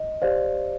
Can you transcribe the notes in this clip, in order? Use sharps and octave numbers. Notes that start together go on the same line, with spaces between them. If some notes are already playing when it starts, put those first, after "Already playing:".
Already playing: D#5
G4 C5 D5 F5